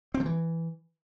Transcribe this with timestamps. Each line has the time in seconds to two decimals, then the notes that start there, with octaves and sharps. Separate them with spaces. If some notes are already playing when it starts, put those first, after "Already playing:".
0.14 C4
0.20 F3
0.26 E3